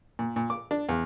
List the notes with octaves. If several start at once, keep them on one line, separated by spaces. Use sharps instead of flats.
A#2
A#2
D6
D4
E2